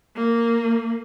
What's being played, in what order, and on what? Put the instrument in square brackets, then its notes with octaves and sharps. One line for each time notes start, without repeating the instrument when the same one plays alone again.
[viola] A#3